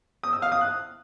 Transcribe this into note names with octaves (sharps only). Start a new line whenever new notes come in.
D#6
E6
F5
D#6
F#6